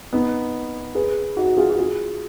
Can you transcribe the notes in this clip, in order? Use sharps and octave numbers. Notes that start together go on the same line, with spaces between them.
B3 D#4
G#4 B4
D#4 F#4
F4 G#4
F#4
F4 G#4